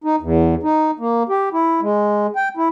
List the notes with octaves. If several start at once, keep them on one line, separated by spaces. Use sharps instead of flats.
D#4
E2
D#4
A#3
G4
E4
G#3
G5
E4